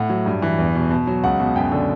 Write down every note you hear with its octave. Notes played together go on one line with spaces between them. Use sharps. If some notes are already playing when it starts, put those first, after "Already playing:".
Already playing: A2 F#5
F#3
G2
E3
E2
B2
B2
F#3
C#2 F#5
B2
F#2 G5
D3